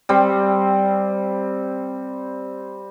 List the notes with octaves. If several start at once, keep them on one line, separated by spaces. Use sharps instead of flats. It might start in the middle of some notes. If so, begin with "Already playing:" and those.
G3 C4